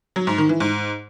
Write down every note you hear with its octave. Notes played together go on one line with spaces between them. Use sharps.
F#3
G#2
D#3
E3
G#2